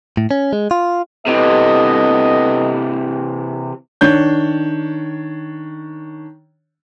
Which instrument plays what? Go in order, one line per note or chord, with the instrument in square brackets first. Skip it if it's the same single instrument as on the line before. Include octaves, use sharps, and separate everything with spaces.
[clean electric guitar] A2
C#4
G#3
F4
[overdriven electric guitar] C3 E3 [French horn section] B3 A4 D#5
[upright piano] D#3 D4 C#5 G6